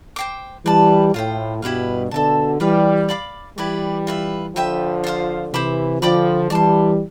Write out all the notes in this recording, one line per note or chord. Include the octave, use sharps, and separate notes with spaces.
C5 G5 D6
E3 G3 B4 D5 A5
A2 F4 C5 G5
G2 B2 E4 G4 B4 F5
B2 D3 A4 E5 A5
E3 G3 F4 B4 D5 F5
D5 F5 B5 D6
E3 G3 E4 G4 B4 D5
F4 B4 E5
D3 F3 G4 B4 E5 G5
F4 C5 F5
C3 E3 C5 E5 B5 D6
D3 F3 D5 G5 B5 D6
E3 G3 D5 A5 C6